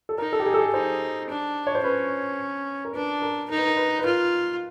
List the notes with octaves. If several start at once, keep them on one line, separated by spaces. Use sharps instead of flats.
A4
D#4 A#4
A4
G4
G#4
A4
G#4
D#4 C5
D4
C#5
C5
C#4 B4
A#4
D4 B4
A#4
D#4 A#4
B4
A#4
B4
B4
F4 A#4